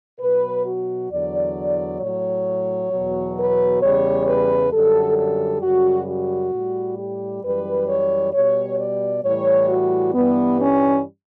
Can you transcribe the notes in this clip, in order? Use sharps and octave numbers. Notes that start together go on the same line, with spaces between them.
B2 F#3 B4
F#4
E2 D3 F#3 D5
A2 F#3 C#5
E2 B2 F#3
B4
E2 C#3 G3 C#5
B4
F#2 D3 G3 A4
A4
F#2 C#3 G3 F#4
F#4
A2 G3
G4
F#2 E3 G3 B4
C#5
B2 G3 C#5
D5
A2 E3 G3 C#5
F#4
G2 E3 G3 B3
C#4